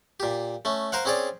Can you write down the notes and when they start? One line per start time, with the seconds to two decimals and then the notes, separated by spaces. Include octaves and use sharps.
0.20 A#2 G4
0.65 A3 C#4
0.92 A#4 C5 F5 F#5
1.05 C4 C#4 G#4 C#5 D5